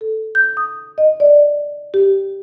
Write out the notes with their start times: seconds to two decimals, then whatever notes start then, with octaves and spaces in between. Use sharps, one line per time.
0.01 A4
0.35 G6
0.57 D#6
0.98 D#5
1.20 D5
1.94 G4